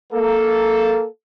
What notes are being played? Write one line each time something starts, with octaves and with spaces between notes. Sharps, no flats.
A#3 A4